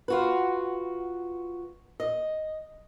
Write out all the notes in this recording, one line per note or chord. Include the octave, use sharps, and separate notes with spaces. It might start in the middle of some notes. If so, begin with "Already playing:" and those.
F4 F#4 B4
D#5